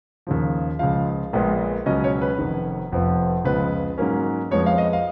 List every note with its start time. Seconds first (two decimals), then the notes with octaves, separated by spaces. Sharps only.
0.27 D#2 C#3 F3
0.79 C#2 C#3 F3 F5
1.33 A#1 A#2 G#3 B3
1.86 C#2 B2 F#3 C#4 D#5
2.04 C#5
2.21 B4
2.38 F1 F2 D#3
2.92 F1 F2 F3 B3
3.44 C#2 C#3 F3 B3 B4
3.98 G#2 F#3 A#3 C#4
4.51 F2 F3 G#3 B3 C#5
4.66 F5
4.78 D#5
4.93 F5